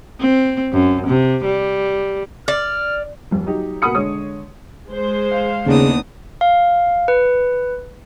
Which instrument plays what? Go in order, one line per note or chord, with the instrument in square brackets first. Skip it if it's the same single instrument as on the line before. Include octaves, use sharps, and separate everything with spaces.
[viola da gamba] C4
F#2
C3
G3
[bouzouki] D5 [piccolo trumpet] F6
[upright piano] D#1 F2
F#3 D#4 G4
B2 A#3 F#5 B5 D#6 C#7
D3 G#3 C#5 D#6
[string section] G#3 C5
[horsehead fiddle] F5
[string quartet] D#2 D4 D#6 [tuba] C#3 [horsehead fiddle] B3 D#4
[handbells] F5
B4